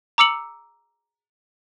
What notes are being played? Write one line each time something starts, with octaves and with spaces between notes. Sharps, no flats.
A#5 D6 E6 C#7 F#7